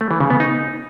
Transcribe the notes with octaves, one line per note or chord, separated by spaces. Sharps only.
A3
E3
C#3
B3
D#4